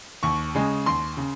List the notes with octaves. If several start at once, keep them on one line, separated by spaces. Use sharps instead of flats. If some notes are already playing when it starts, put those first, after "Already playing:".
D#2 C#6
C#3 G#3
D#2 C6
C#3